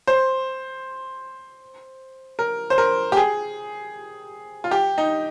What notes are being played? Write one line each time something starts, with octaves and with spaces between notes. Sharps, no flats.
C5
A#4
C5
A#4
G4
G#4
F4
G4
D#4